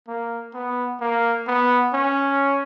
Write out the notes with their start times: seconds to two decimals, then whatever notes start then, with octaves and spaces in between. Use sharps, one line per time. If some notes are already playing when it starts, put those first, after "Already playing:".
0.08 A#3
0.54 B3
1.01 A#3
1.47 B3
1.94 C#4